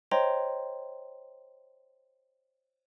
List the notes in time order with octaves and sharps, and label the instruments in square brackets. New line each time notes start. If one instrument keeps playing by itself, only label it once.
[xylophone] C5 C#5 D#5 G5 A#5 C6